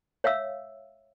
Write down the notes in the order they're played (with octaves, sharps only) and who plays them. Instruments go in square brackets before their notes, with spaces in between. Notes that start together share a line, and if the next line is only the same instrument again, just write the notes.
[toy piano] C#5 E5 F5 E6